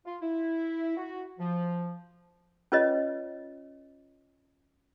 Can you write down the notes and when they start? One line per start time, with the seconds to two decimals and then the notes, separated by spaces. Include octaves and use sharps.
0.06 F4
0.22 E4
0.97 F#4
1.38 F3
2.72 C#4 F4 B4 C#5 D#5